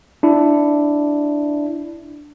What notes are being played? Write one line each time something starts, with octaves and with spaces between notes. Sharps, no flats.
D4 E4